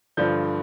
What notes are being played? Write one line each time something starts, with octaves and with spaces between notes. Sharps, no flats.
G2 D3 F3 G6